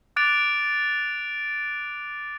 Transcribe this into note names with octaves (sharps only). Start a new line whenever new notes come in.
D6 F#6 A6 D7 F7